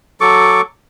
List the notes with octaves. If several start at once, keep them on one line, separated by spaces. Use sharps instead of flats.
F#3 A4 C#6 D6